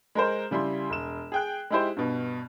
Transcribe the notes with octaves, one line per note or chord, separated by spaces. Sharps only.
G#3 A#4 C5
C#3 G3 E4 C6
E1 E7
G#4 G5 F#6
G#3 D#4 E4 G4 C5
G2 B2